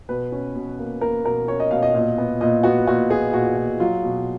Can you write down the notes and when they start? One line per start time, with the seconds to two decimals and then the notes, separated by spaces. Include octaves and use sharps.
0.09 B2 B4
0.32 C#4
0.56 B2
0.79 A#3
1.01 A#3 A#4
1.25 B2 A#4
1.48 C#4 C#5
1.60 D#5
1.71 B2 F5
1.83 D#5
1.94 A#2
2.18 B3
2.41 A#2 D#5
2.64 B3 F#4
2.87 A#2 F#4
3.10 B3 G#4
3.34 A#2 F#4
3.57 A#2
3.80 F#3 F4
4.03 B2